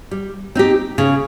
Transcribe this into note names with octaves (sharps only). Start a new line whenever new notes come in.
G3
C4 D#4 G4
C#3